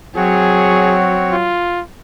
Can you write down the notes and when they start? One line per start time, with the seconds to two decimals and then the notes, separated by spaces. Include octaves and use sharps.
0.16 F#3 C4 F#4 G#4 C#5
1.32 F4